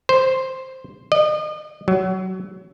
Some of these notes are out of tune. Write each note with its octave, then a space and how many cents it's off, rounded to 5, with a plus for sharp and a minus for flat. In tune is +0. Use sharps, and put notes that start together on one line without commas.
C5 +0
D#5 -35
F#3 +25